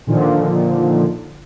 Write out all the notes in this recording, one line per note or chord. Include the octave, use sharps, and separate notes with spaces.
A#2 D3 D#3 F3